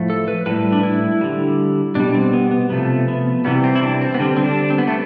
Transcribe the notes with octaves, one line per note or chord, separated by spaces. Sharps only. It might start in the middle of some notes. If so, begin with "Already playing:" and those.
Already playing: A2 F3 A3
A4
B4
A2 G3 B4
D4
E4
D3 G3
B2 G3 D4
C4
B3
B3
C3 F3 A3 B3
B3
C3 E3 G3 B3
C4
E4
D4
C4
B3
D3 G3 C4
C4
D4
C4
B3
A3